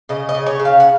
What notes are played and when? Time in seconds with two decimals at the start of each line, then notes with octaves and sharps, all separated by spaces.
0.09 C#3 D#5
0.29 D#5
0.35 C#3
0.46 C#5
0.60 C#3
0.65 F5
0.80 F#5